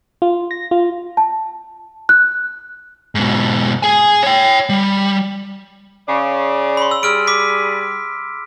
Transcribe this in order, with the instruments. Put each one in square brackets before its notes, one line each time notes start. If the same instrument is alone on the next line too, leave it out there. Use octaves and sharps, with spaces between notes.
[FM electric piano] F4
A#6
F4
[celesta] A5
F#6
[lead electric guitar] G#2 B2
G#4 G#5
C#5 G5
G3
[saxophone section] C#3 D5
[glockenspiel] B5 C6
E6
[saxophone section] G3 G#4 [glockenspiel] E6 F6 D7
[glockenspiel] D6 B6